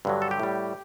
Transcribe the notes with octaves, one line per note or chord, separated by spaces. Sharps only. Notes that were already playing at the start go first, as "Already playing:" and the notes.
G2 D3 F#3
A4
G4
A2 G3